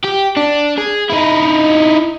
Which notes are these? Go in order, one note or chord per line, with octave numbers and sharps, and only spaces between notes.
G4
D4
G#4
D#4 E4